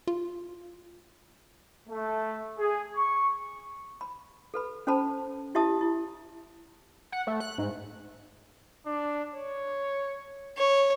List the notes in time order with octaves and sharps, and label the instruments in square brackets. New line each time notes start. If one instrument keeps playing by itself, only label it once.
[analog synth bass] F4
[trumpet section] A3
G#4
C#6
[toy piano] B5
A4 B4 B5
C#4 A4 C5 A5 B5
E4 G4 E5 A5 D#6
E4
[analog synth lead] F#5
A3
F#6
G#2
[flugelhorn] D4
C#5
[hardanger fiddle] C#5